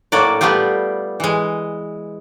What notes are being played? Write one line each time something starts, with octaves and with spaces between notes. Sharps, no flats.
A2 F#3 A#3 F#4 D5
G3 A3 B3 F4 G4
E3 G#3